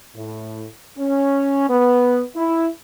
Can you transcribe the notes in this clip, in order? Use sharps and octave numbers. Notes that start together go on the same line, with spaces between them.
A2
C#4
B3
E4